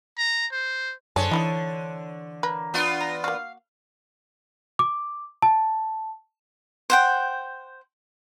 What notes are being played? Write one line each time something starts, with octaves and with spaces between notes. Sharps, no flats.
A#5
C5
F#2 D3 G#4 C5 C#5 A5
E3 D#4 E4 D#5
A#3 B4
B3 D4 F4
A#5
A#3 F#4 F5
D6
A5
C5 F#5 G5